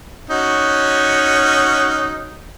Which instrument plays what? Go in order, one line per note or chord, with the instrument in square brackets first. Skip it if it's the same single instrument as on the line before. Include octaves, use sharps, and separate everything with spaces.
[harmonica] C#4 D#4 F#4